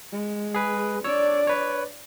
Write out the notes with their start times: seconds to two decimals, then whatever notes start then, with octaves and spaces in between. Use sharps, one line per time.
0.12 G#3
0.54 G#4 B4
1.04 D4 C#5 D5 E6
1.47 B4 C#5